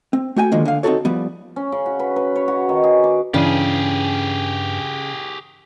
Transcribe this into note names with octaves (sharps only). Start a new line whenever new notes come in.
C4
A3 F#4 G5 G#5
D3 D#3 F3 G#3 A#3
D3 F5
C4 D#4 E4 F#4 A4 C#5
F3 G3 B3
C#4
C#3
F#4
B4
B4
C#5
F#4
D#3
G#4
D6
G2 C#3 E3 D4 G4 G#4